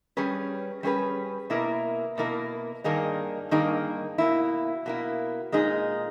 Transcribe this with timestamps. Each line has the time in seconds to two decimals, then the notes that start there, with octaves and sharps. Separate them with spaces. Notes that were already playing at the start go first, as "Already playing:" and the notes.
0.17 G3 C#4 G#4 B4
0.83 G3 C#4 G#4 B4
1.50 B2 A#3 E4 A#4
2.18 B2 A#3 E4 A#4
2.84 G2 D#3 A#3 D#4 G#4
3.51 G2 D#3 A#3 D#4 G#4
4.18 B2 A#3 E4
4.86 B2 A#3 E4
5.52 A#2 G#3 D#4 G#4